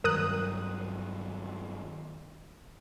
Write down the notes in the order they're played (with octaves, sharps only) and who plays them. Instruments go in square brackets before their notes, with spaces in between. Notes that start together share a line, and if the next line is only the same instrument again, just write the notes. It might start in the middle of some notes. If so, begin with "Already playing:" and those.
[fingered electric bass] G2 D#3 F#3 [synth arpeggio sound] A#4 D#6 F#6